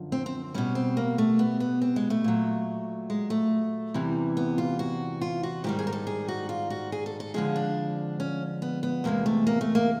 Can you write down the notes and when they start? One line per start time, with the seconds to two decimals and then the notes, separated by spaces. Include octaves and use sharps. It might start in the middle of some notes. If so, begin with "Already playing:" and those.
Already playing: F#2 D3 F3
0.12 C4
0.26 C4
0.54 B2 G3 C#4
0.75 C4
0.97 A#3
1.18 A3
1.39 B3
1.60 B3
1.82 C4
1.96 G#3
2.10 A3
2.24 A#2 F#3
3.10 G#3
3.30 A3
3.94 E2 C3 E3 G3
4.37 B3
4.58 F4
4.79 F#4
5.21 F4
5.43 F#4
5.64 G#2 D#3 G3 G4
5.79 G#4
5.87 A#4
5.92 A4
6.07 G#4
6.28 F#4
6.49 F4
6.70 F#4
6.92 G#4
7.06 A4
7.20 A4
7.34 F2 D3 F3 G#3 G#4
7.56 D4
8.20 C#4
8.62 B3
8.83 B3
9.04 E2 C3 F3 G#3 A#3
9.26 A3
9.47 A#3
9.61 A3
9.75 A#3